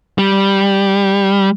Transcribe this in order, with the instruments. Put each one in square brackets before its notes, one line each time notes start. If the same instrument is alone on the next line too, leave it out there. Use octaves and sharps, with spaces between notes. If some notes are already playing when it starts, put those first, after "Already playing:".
[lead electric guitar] G3